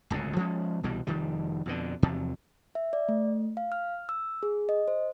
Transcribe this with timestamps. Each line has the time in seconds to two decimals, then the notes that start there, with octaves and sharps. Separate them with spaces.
0.10 D1 C#2 F#2 C#3
0.36 F3 G#3 C#4
0.83 C2 B2 E3 G3
1.07 F1 D#3 F3 G3
1.66 F2 B2 D3
2.03 E2 C3 F3 F#3
2.75 E5
2.93 D5
3.09 A3
3.57 F5
3.72 F6
4.09 E6
4.43 G#4
4.69 D#5
4.88 C5